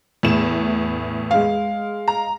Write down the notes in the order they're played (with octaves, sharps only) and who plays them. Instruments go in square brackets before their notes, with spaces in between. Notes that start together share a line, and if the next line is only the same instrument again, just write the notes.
[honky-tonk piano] E2 A2 E7
[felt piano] G#3 F5
[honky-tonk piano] A#5